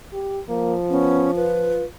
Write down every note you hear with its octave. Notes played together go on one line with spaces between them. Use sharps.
G4
F3 A#3
B3 C#4
F4 B4